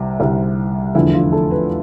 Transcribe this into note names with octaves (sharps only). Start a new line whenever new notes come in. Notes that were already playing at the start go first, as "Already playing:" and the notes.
Already playing: C2 C3 G3
C2 C3 G3
F1 E2 D3 F3 E4
F4
A4
B4